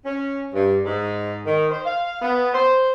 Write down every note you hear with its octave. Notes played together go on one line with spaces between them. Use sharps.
C#4
G2
G#2
D#3
C5
F5
B3
C5